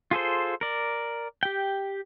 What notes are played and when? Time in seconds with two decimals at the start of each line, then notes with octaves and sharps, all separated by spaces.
0.11 F4 G#4 A4 C5
0.61 A#4 D5
1.43 G4 G5